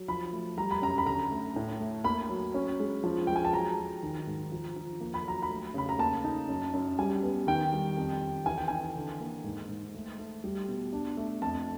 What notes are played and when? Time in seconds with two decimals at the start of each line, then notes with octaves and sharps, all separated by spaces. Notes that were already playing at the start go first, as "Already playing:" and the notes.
Already playing: F#3
0.08 F3 B5
0.33 A3
0.57 G3 A#5
0.71 B5
0.82 F#2 A#5
0.98 B5
1.06 D3 A#5
1.31 A3
1.56 A2
1.80 A3
2.04 A#3 B5
2.29 F#3
2.54 C#4
2.80 G#3
3.04 F3
3.27 G#3 G5
3.36 G#5
3.45 A5
3.52 F#3 A#5
3.78 F#3
4.03 D#3
4.27 G#2
4.52 F3
4.76 F3
5.01 A#3
5.14 B5
5.25 F#3 A#5
5.42 B5
5.50 A3
5.74 C#3 B5
5.89 A#5
5.99 A#3 A5
6.24 D#4
6.49 F#2
6.73 F#2
6.99 G3 G#5
7.23 B3
7.47 D#3 G5
7.73 G3
7.97 F2
8.21 F2
8.46 E3 G#5
8.58 G5
8.68 E3 G#5
8.95 D3
9.21 A#3
9.44 G#2
9.69 G#2
9.94 A3
10.18 A3
10.44 G3
10.68 B2
10.93 D4
11.17 A3
11.42 F2 A5